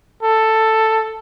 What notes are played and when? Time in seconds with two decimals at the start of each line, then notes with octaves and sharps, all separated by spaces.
0.23 A4